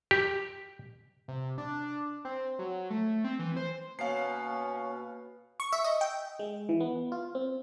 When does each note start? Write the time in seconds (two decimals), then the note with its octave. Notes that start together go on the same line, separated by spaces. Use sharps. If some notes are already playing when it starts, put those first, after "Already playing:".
0.11 G4
1.28 C3
1.58 D4
2.25 C4
2.59 F#3
2.90 A3
3.24 C4
3.39 E3
3.56 C5
3.99 B2 A#3 C#4 C#5 F5 C7
5.60 C#6
5.73 E5
5.84 D#5
6.01 G5
6.39 G#3
6.69 E3
6.80 B3
7.12 F4
7.35 C4